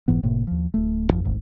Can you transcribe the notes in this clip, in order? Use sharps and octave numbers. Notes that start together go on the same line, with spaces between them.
F1 G#2 E3 B3
F#1 A2 C3 A#3
D#2 F3
D1 A3
G#1 F2 F3
D#1 G#1 D2 G#2